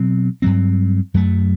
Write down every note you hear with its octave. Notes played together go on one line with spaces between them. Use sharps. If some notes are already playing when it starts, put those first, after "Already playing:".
Already playing: B2 F#3 C4
G2 F#3 C4
F#2 F#3 A3